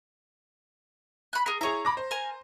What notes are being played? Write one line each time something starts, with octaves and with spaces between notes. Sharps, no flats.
B5 F#6
G#4 A#4
E4 G#4 C#5 A#5
B5 D6 A#6
C5
A#4 G#5